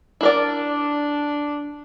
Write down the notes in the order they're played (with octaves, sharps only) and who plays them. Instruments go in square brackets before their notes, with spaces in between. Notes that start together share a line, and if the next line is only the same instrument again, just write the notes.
[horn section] D4 [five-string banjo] E4 A#4 D5